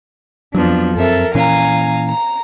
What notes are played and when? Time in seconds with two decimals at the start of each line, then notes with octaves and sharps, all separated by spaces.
0.55 F2 F3 F#3 B3 D4
0.96 F#2 C4 A4 A#4 E5
1.35 A#2 E3 C#4 F5 G#5 A#5
2.07 A#5